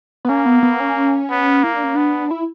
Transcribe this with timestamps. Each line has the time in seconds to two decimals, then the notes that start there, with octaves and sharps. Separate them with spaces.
0.25 B3
0.29 A#3 C#4
0.46 B3
0.63 B3
0.80 C#4
1.30 B3
1.63 A#3 E4
1.73 D4
1.84 C#4
1.95 B3 D4
2.31 E4